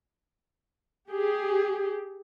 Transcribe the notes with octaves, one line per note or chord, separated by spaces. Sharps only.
G4 G#4